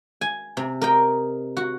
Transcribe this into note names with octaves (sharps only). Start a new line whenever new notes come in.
G#5
C3
A#4 D#5 G5
F#4